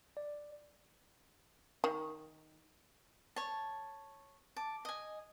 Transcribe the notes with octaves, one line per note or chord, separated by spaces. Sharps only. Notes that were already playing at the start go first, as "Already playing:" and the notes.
D5
D#3
C#5 A5
A5 D6
D#5 G#5